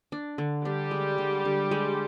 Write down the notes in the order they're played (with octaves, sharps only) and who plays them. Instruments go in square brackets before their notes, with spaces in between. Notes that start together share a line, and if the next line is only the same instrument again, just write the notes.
[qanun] D4
D3
[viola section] G3 G4 [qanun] D4
[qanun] G#3
D3
D3
G#3